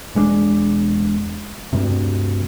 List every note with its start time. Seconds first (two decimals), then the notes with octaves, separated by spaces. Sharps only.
0.15 E1 G#3 A#3 D4
1.73 D2 G2 C3